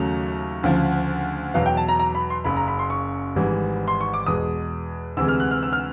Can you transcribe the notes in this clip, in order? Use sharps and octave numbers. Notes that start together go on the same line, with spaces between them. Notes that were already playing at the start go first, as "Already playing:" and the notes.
Already playing: D#2 C#3 F#3 A3
D2 C#3 F3
E2 B2 F#3 F5
G5
A5
A#5
A#5
B5
C6
F#1 F#2 C#3 B5
A#5
B5
C6
C#6
G#1 G#2 E3 G3
C6
C#6
D6
E2 B2 G#3 D#6
D2 C3 E3 G#3 E6
F6
F#6
F6
E6
F6